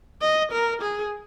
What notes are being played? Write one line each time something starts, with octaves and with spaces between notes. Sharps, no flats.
D#5
A#4
G#4